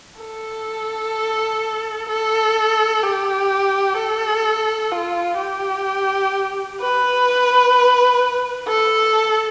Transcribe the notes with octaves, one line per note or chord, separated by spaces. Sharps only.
A4
A4
G4
A4
F4
G4
B4
A4